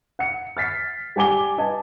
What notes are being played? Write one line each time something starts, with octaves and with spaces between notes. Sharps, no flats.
F#5 C#7
F6 A6 B6 C7
G3 G4 G#5 D6 G7
B4 D#5 G#5 A5